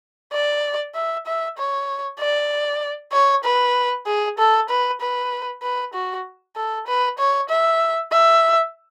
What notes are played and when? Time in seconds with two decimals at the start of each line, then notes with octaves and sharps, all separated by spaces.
0.33 D5
0.95 E5
1.26 E5
1.58 C#5
2.20 D5
3.13 C#5
3.44 B4
4.06 G#4
4.38 A4
4.69 B4
5.01 B4
5.62 B4
5.94 F#4
6.56 A4
6.87 B4
7.18 C#5
7.49 E5
8.12 E5